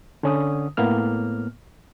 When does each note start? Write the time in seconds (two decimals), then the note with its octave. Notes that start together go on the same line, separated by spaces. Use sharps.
0.23 D3 C#4 D#6
0.77 A2 A#3 B3 F6